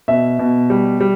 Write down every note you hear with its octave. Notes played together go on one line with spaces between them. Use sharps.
B2 E5
B2
G3
G3